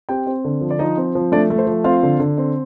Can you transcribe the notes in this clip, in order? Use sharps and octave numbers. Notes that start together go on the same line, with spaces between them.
C4 G4 G5
C4
D3
F3
D5
F3 D#4 D#5
C4
F3
A3 D4 D5
A3
C5
F3
C4 F4 F5
D3
D3
C4